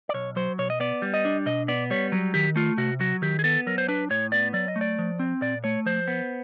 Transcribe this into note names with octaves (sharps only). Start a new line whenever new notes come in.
D5
B1 C#5
F#3 C5
B2 C#5
D#5
B3 D5
G3
D#5
D4
B2 D#5
B3 D5
G3 C#5
F#3
D#3 G4
A3 F4
C3 F#4
F#3 F#4
D#3 G4
G#4
B3 A4
F#3 A#4
C5
D4 B4
A2 C#5
B3 D5
F#3 D5
D#5
A3
D5
F3
C4
A#2 D5
A3 C#5
F3 C5
B3